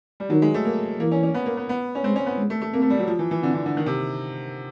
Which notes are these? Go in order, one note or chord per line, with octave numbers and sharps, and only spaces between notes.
G3
D#3 F#3
G#3
A3
A#3
E3 A#3
C#4
C#4
B3
A#3
B3
B3
C#4
G#3 C4
C#4
B3
G#3
A3
A3
A#3 C4
A3
G3
F#3
F3
E3
E3
D3 C4
D3
D3
D#3
C3